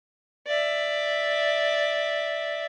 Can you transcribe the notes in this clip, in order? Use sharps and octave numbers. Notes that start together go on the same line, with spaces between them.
D5 E5